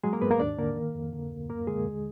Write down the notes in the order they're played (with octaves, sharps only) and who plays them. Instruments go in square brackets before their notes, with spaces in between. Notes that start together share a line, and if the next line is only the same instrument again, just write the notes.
[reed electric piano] F#3 G#3 G#4
A#3 A#4
G#2 B3 B4
A#3 A#4
D#2 D4 D5
D3 A#3 A#4
D#3
F2
D3
D2
F#2 A#3 A#4
D3 G#3 G#4
D#2